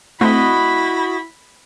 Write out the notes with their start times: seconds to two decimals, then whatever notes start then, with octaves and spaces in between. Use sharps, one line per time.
0.21 A3 C4 E4 F#4 D#5 B5